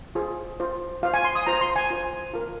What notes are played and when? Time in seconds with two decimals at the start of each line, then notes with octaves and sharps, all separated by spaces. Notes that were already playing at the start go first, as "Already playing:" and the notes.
0.15 F4 G#4 C5
0.60 F4 C5
1.03 F4 C5 F5
1.14 G#5
1.24 C6
1.35 D#6
1.46 F4 C5 A#5
1.61 C6
1.76 G#5
1.91 F4 C5
2.34 F4 A#4